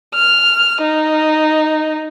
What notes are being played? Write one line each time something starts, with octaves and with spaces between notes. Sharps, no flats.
F6
D#4